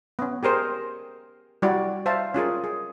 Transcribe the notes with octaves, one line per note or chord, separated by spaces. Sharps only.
B3 C#4
G4 G#4 A#4 C5
G3 E4 F#4 D5
C5 E5 F5 A5
C#4 F4 G#4 A#4
G#4